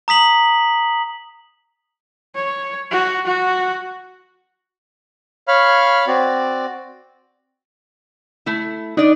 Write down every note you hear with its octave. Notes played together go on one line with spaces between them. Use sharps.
A#5 D#6 B6 F#7
C#5
F#4
F#4
C#5 F5 B5 F6
C4 F#4 D5
A3 E4
D4 D#4 D5 D#5